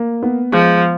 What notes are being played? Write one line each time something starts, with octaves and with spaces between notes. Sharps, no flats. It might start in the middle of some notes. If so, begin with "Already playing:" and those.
Already playing: A#3
B3
F3 G#3